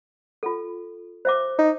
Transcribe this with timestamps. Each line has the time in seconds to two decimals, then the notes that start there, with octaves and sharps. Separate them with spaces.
0.43 F4 A4
1.25 C5 E5 D6
1.59 D#4